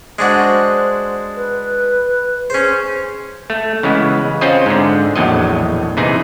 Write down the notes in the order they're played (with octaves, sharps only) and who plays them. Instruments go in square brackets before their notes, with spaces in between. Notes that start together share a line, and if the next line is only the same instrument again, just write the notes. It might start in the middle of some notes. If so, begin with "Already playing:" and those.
[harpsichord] G#3 D4 F#4 [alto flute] C5
[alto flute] B4
[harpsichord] C#4 C5 [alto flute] G#4
[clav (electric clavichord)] A3
C#3 E3 G#3 B3
C4 C#4 F4 C5 D#5
G#2 D3
A#1 E2 A2 F#3 D#5
C3 E3 D#4 G#4